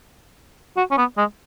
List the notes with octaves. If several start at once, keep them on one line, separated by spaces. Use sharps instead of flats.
F#4
C#4
B3
G#3